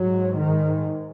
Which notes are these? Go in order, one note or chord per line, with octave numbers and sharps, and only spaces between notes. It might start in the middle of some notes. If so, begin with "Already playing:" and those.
Already playing: G#2 F#3
D#3